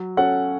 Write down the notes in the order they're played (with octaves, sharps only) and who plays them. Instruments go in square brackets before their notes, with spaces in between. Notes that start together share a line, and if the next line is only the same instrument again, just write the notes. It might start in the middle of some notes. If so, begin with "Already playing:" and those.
Already playing: [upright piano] F#3
[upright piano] C#4 F#4 A4 C#5 [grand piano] F#5